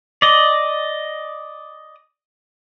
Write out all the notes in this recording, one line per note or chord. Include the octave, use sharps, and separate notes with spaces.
D5 D#5